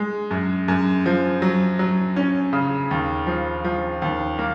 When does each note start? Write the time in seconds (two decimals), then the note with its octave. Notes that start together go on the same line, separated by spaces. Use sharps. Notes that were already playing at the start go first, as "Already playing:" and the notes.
Already playing: G#3
0.31 F#2
0.68 F#2
1.06 F3
1.42 F#3
1.79 F#3
2.16 C#4
2.53 C#3
2.91 D#2
3.27 F3
3.65 F3
4.02 D#2
4.39 A#3